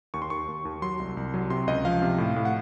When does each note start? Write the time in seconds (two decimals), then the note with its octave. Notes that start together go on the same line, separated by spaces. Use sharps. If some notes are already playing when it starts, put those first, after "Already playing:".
0.14 D#2 C#6
0.22 C6
0.30 D#2 C#6
0.48 D#2
0.65 D#2
0.82 F#3 C6
1.00 C2
1.17 C2
1.34 F#3
1.50 C3 C6
1.67 C#2 D#5
1.85 F3 F5
2.02 C3
2.18 A2
2.36 A2
2.45 F#5